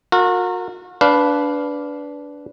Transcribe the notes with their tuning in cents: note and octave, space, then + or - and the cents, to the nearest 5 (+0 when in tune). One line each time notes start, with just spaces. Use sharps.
F#4 -40 A#4 -20
D4 -20 B4 +0 F5 +5